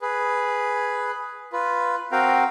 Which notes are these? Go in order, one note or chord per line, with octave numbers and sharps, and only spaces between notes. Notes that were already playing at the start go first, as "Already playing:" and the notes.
G#4 B4
F4 B4
C4 F#4 A#4 F5 G5